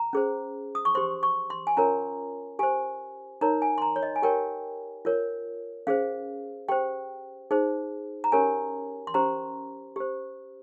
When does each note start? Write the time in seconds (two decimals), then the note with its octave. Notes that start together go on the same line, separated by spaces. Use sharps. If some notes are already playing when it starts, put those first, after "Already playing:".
Already playing: A#5
0.13 C#4 G#4 C5
0.75 D#6
0.85 C#6
0.95 G4 C5 C6
1.23 C#6
1.50 C6
1.67 G#5
1.77 C#4 F4 A#4 C#5 A#5
2.59 G4 C5 G#5
3.41 D#4 A#4 C#5 A#5
3.62 G#5
3.78 C6
3.82 A#5
3.96 C#5
4.03 D#5
4.16 G#5
4.22 G4 A#4 C#5 G5
5.05 F4 A#4 C#5
5.87 C#4 G#4 C5 F5
6.69 G4 C5 G5
7.51 D#4 G#4 C5
8.24 A#5
8.32 C#4 G4 A#4 C#5 G#5
9.07 C6
9.14 C#4 G4 C5 A#5
9.96 G4 C5